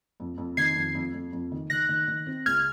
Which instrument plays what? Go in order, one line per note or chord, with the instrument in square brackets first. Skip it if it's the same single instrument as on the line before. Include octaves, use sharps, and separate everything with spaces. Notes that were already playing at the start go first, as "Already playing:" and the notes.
[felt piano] F2
F2
[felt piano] D#3 [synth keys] G#6 C7
[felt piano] F2
F2
F2
F2
D#3
[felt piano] D#3 [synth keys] F#6 A#6
[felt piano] D#3
D#3
C4
[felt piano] C#2 [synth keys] F6 G#6